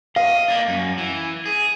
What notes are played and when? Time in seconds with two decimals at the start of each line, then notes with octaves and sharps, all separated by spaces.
0.16 D#5 F5
0.48 A#3 D4
0.68 F#2
0.98 E3
1.46 G#4